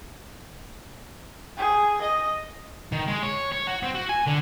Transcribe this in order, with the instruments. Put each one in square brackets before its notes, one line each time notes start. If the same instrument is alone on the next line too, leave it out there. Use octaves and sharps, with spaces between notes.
[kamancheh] G#4
D#5
[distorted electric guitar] D#3
G#3
C#5
C#5
F#4
C4
F#4
G#5
D3